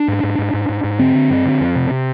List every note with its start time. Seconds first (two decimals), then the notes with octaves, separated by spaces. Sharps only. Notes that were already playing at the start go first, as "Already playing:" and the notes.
Already playing: D4
0.08 G#2
0.23 G#2
0.39 G#2
0.54 G#2
0.69 G#2
0.84 G#2
0.99 D3 C4
1.15 D3
1.30 G2
1.45 D3
1.60 F2
1.75 C3
1.91 C3